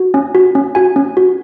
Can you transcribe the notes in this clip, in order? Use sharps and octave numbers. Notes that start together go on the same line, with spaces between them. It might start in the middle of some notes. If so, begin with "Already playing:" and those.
Already playing: F#4
C#4
F#4
C#4
F#4 G#5
C#4
F#4